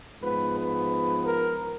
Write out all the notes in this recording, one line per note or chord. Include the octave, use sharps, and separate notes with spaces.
G#2 F3 B3 B4
B4
A#4